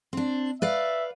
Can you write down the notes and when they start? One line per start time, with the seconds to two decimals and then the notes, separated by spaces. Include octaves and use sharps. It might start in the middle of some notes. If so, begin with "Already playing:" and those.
0.13 C4 D4
0.62 B4 D5 E5 F5